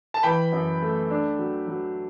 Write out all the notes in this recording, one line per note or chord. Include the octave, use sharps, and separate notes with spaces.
A5
E3 G5 B5
F#2
A3
D4
F#3
F#3